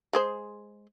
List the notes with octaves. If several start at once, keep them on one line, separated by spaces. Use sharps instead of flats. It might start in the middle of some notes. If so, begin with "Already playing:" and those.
G#3 G#4 C5